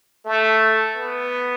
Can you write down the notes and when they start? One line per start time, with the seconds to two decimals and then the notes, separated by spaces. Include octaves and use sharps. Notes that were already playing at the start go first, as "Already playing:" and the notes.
0.25 A3
0.95 B3